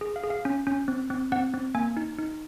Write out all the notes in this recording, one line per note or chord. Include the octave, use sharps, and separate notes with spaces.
G#4
F5
G#4
F5
C#4
C#4
C4
C4
C4 F#5
C4
A#3 G#5
D#4
D#4